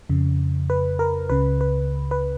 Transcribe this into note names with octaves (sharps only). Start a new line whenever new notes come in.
F2 C#3
B4
A#4
C#2 C#3 B4
B4
B4